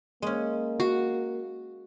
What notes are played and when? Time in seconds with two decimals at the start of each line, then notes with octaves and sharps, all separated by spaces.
0.22 G#3 A#3 C#4
0.80 F#4